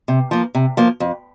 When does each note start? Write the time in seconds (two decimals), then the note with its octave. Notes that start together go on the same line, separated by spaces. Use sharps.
0.08 C3
0.31 F3 A#3
0.55 C3
0.77 F3 A#3
1.00 F2